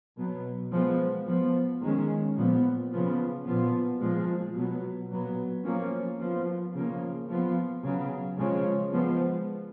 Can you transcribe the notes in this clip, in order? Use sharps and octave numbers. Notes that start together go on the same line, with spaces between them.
B2 F#3 B3
F3 G#3 B3
F3 B3
D#3 G#3 C#4
A#2 F3 B3
C#3 F3 B3
A#2 F3 B3
A#2 F3 G#3
B2 F#3 B3
A#2 F#3 B3
F3 A#3 C#4
F3 B3
C#3 F3 A#3
F3 B3
C#3 F#3 B3
C#3 F3 G#3 C#4
F3 G#3 B3